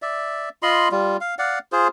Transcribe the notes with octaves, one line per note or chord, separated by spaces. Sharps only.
D5 E5
F4 D#5 B5 C6
G3 F4
F5
D5 F5 F#5
F4 G#4 C5